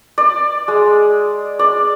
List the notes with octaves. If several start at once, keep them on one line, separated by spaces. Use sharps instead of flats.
D5
G#3
D5